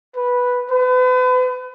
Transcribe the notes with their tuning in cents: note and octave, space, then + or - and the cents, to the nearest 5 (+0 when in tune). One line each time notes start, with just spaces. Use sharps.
B4 -5
B4 +35